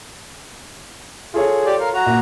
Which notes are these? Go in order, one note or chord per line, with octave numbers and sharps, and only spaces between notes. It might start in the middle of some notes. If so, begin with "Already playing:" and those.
F4 G#4 A4 C#5
G4 D5
A#4 F5
F#4 A#5
A#2